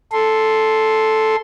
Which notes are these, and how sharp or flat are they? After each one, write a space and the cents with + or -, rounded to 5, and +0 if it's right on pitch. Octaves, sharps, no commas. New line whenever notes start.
A4 -5 C6 +0